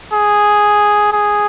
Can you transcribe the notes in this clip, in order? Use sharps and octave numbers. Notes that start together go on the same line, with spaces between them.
G#4
G#4